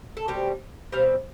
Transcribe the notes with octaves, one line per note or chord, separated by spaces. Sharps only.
A4
B2 G3 C4 G4
B2 G3 C4 F5